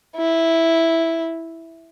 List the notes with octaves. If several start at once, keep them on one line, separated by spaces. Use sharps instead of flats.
E4